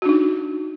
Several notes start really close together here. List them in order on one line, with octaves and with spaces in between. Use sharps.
F#4 D4 D#4